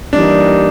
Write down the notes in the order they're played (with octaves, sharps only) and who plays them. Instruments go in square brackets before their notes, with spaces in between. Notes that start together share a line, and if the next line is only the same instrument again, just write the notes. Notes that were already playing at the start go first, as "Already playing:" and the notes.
[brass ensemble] E3 G3 A#3 D#4 [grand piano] D4